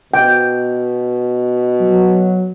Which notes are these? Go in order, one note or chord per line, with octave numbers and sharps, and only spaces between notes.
B2 G5
F#3